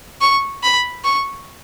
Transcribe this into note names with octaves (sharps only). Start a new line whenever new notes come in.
C#6
B5
C#6